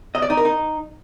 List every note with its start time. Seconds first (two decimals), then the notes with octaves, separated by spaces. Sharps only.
0.15 D#5
0.22 D5
0.30 D#4
0.37 A#4
0.45 D#4